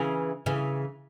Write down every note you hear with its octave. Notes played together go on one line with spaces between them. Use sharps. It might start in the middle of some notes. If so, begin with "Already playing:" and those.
Already playing: C#3 E3
C#3 E3